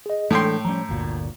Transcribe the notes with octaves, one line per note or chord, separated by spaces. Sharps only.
G#4 D#5
A2 E3 G#3 D4 A4 G5 C6
F3 G3 C#4 A#5
G1 D2 A#2